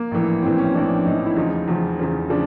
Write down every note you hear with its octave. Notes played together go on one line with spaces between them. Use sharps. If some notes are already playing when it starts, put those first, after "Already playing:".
Already playing: A#3
A#1 A2 E3
A#1 A2 E3 C4
C#4
A#1 A2 E3 D4
A#1 A2 E3 D#4
E4
E2 C#3 F3 D#4
E2 C#3 F3
E2 C#3 F3
C#3 F3 D4